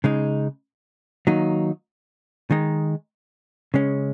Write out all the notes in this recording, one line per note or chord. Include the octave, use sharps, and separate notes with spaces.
C#3 G#3 D#4
D#3 F#3 A#3 D#4
D#3 G#3 D#4
C#3 G#3 C#4